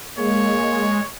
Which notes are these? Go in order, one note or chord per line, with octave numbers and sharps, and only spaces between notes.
G#3 A#3 C#5